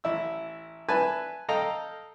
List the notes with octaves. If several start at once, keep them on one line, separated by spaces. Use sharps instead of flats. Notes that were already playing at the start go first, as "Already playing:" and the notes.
A1 E4 E6
B4 E5 G#5 A5
A4 D#5 F5 G5 A#5